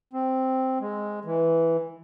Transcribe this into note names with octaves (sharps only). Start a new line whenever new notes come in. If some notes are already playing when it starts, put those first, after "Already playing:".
C4
G#3
E3